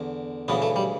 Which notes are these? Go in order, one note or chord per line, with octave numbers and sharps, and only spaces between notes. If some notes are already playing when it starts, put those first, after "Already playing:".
Already playing: E2 D3
D2 C#3 E3 B3
A3
G3